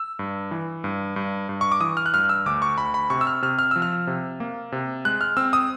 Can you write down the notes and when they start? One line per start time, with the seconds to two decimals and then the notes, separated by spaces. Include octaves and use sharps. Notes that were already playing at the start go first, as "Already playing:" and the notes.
Already playing: E6
0.19 G2
0.51 E3
0.84 G2
1.16 G2
1.49 G2
1.61 C#6
1.72 D6
1.81 E3 D#6
1.97 F6
2.06 F#6
2.14 G2 F6
2.29 E6
2.46 D2 D6
2.62 C#6
2.78 D2 B5
2.94 B5
3.10 C3 C#6
3.21 E6
3.27 F6
3.42 C3 F6
3.59 F6
3.71 F3 E6
3.82 F6
4.07 C3
4.40 A#3
4.72 C3
5.05 G#3 F#6
5.21 F6
5.37 C4 E6
5.53 D#6